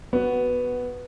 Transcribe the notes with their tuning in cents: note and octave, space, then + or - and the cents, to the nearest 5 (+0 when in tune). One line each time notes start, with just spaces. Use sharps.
B3 +0 F#4 +10